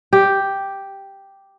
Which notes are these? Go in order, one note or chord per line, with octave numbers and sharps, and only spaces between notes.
G4